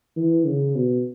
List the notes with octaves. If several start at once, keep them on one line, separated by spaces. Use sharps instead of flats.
E3
C#3
B2